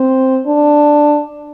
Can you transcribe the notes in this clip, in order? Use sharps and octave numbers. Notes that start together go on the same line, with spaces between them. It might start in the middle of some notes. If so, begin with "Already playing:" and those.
Already playing: C4
D4